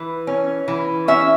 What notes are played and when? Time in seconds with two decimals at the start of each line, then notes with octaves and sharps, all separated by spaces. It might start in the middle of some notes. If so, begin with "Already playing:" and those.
Already playing: E3
0.27 C#4
0.68 E3
1.08 C#4 E5